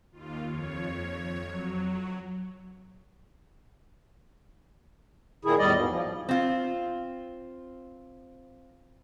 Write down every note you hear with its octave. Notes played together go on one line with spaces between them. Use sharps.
D#2 F4
F2 C#5
F#3
A#2 D#3 E4 G#4
E2 A2 G3 D5 D#5
G#2 B2
F3
C4 F4